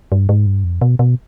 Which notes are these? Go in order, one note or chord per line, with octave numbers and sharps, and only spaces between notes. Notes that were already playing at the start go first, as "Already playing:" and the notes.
G2
G#2
G2
F2
B2
B2